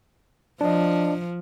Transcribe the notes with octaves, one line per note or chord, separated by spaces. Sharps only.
F3 D4 D#5